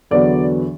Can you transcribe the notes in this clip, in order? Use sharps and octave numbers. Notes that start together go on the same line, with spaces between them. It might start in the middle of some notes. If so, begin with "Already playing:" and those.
E2 D3 F#3 B3 D5